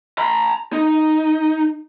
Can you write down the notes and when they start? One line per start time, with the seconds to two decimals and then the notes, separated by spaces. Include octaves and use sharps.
0.18 A#5 B5
0.73 D#4